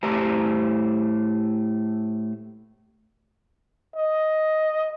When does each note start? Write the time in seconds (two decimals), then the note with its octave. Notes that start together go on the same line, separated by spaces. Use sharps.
0.03 A2 A3 G4 C5 A5 A#5
3.96 D#5